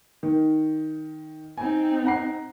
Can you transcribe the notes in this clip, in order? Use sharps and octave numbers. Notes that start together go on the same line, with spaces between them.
D#3
C4 D#4 G#5
F#5 A#5 C7